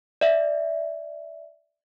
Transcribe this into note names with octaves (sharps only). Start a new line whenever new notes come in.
D5 E5